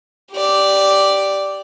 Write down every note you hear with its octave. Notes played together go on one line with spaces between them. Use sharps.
G4 D5